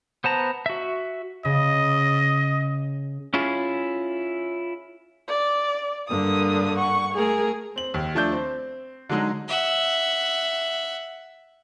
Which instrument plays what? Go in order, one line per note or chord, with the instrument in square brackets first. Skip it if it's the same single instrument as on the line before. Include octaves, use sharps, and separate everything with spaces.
[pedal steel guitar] B3 C5 A5 A#5
F#4 E5
[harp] C#3 [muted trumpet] D#5
[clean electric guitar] C#4 E4 F4 G#4
[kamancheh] D5
[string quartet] G2 D3 A#3 [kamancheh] D#6
[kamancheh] F#5 C#6
[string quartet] A3 A#4 [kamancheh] G#4
[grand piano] C4 F#7
D#2
F3 A3 D4 A5 G6
C4
D3 F#3 G#3 D#4
[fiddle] E5 F#5